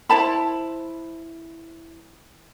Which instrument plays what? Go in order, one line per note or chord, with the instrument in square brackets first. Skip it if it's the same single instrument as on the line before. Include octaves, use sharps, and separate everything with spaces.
[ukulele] E4 C5 A5 B5